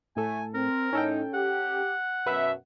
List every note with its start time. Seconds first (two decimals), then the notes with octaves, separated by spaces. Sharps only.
0.16 A2 A3 A4 G#5
0.54 C4 A#4
0.93 A2 C#4 D#4 A4 G5
1.34 G4 F#5
2.26 F#2 B2 B4 E5